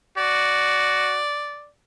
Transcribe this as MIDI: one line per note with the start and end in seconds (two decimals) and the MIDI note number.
0.17 1.21 66
0.17 1.69 74